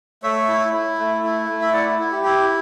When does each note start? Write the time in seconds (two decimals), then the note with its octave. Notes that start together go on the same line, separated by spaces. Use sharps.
0.23 A3 C#5 E5
0.48 E4
0.73 E4
0.98 A3
1.24 E4
1.49 A3
1.62 E5
1.73 E4 D5 F#5
1.99 E4
2.12 G4
2.24 E4